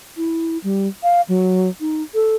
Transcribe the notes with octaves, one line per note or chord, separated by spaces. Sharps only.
E4
G3
F5
F#3
D#4
A4